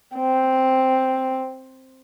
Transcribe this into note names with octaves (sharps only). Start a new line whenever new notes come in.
C4